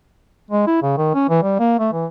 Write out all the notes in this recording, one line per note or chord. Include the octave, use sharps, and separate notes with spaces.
G#3
E4
C#3
D#3
C#4
E3
G3
A#3
A3
E3